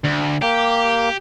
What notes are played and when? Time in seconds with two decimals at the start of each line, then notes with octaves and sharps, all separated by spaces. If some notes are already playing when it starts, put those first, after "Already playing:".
0.05 D2
0.42 A#3 G4